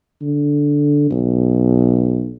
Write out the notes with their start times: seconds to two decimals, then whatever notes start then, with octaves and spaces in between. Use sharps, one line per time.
0.22 D3
1.11 B1